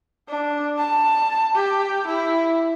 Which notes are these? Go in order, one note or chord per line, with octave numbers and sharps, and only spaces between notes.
D4
A5
G4
E4